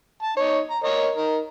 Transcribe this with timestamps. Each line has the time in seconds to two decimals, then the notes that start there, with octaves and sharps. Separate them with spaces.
0.23 A5
0.37 D#4 C#5
0.70 A#5
0.84 A#4 C#5 D#5
1.15 D#4 A#4